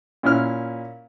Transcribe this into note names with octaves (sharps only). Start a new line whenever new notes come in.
A#2 C#4 E4 F6